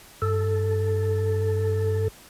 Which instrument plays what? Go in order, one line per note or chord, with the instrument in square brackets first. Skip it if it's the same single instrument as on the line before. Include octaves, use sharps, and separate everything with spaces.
[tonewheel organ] G2 A4